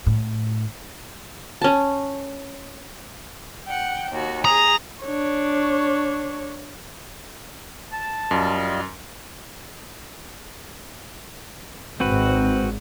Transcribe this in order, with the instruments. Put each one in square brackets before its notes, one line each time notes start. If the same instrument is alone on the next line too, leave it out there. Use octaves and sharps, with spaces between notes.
[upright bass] A2
[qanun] C#4 A5
[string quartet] F#5 G5
D#2 F#4
[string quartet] G#4 [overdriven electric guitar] A#5 [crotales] D#6 F7
[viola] D4 C#5
[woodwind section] A5
[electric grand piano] F#2 [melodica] G3 F4 D#5
[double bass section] G#1 G#2 [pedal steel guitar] C4 F#4 B4